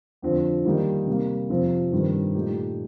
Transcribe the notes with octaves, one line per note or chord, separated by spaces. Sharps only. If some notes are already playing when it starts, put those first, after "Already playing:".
F2 D3 F3 C4
D#3 G3 A#3 D#4 G4
C3 G3 A#3
F2 C3 F3 C4 F4
G2 D#3 G3 C4
A#2 A3 D#4 G4